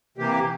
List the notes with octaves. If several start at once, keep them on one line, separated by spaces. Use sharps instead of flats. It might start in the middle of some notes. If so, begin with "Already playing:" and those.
C3 E3 A#3 G4